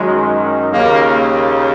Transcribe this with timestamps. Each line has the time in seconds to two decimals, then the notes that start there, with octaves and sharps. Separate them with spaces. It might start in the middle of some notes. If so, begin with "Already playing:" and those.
Already playing: F#2 D#3 F#3 G#3
0.72 D#2 C#3 A#3